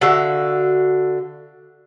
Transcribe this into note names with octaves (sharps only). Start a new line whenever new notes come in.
D3 F#4 E5 F5